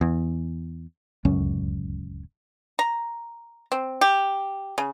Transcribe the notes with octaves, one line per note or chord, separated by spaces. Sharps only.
E2
D1 C#2 F#2 C#4
A#5
C4
G4
C#3